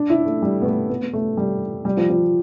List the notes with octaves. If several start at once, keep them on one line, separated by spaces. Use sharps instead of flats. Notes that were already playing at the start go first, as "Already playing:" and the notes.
Already playing: D4
E4
A3
G3
B3
A3
B3
B3
A3
G3
G3
F3
F3